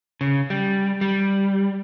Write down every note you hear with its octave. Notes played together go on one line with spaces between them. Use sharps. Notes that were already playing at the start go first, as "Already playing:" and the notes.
C#3
G3
G3